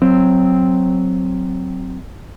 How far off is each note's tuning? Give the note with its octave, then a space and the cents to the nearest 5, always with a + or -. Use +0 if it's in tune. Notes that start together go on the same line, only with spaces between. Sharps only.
F#3 +0 C4 +0